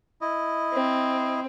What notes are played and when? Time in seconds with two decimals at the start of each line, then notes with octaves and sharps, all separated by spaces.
0.21 E4 D#5
0.73 C4